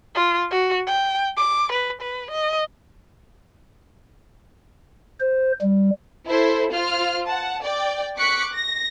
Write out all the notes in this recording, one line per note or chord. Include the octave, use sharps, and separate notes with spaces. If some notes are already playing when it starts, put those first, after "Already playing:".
F4
F#4
G5
D6
B4
B4
D#5
C5
G3
E4 A4 C5
F4 C5 F6
F#5 A5
D5 G5
C#6 D6 F#6 B6 C#7
A#6